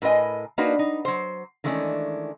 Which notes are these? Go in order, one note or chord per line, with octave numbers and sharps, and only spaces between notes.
A2 A#4 B4 D#5 G#5
A#3 D4 D#4 F#4 B4
D#4
F#3 C5
D#3 E3 G#3 A3 C#4 D4